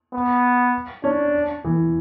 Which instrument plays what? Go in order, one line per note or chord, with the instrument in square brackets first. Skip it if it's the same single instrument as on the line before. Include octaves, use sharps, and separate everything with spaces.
[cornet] B3
[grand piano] C#4 [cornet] D4
[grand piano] E3